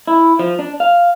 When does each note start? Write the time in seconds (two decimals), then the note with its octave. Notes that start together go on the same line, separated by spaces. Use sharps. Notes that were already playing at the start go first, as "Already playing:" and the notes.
0.08 E4
0.39 F3
0.59 D4
0.80 F5